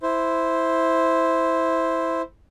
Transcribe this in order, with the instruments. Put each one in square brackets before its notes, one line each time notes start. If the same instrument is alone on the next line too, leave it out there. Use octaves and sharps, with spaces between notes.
[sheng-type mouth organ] E4 C5